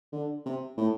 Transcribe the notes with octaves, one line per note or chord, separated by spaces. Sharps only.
D3
C3
A2